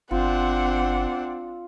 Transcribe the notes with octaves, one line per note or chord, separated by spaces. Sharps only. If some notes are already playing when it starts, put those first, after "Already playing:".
G1 C4 D4 F4 F#5